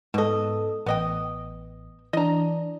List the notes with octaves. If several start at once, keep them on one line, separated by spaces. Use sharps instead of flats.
G#2 B2 A4 D#5
A1 B3 D#5 G5
E3 D4 D#5 A#5